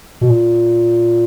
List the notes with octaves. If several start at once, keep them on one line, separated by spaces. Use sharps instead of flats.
B2
A#2